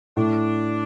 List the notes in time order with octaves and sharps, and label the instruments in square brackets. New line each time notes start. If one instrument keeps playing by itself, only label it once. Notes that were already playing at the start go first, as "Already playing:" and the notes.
[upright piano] A2 [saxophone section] D4